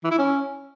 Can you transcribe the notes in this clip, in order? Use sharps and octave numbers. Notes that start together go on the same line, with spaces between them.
E3
E4
C#4